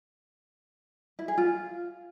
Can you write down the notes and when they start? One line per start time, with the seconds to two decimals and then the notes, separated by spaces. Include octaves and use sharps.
1.19 E4
1.28 G#4
1.38 F4